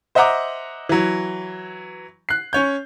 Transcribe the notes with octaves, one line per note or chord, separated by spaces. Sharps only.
C5 D#5 E5 F#5 A#5 D6
E3 F#3
F#6 C7
C#4 C#5 G6